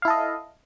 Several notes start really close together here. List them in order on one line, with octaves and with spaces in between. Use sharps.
F5 E4 A4 D#5